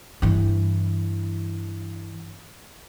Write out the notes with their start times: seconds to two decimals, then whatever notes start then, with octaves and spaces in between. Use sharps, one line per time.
0.22 G2 E3